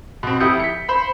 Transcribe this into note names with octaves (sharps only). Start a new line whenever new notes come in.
B2 C4
F1 E4 G4 D#6 G6 C#7
B6 C#7
C5 B5